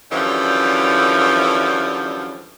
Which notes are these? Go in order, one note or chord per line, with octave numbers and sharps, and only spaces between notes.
F#2 D3 E3 F3 G3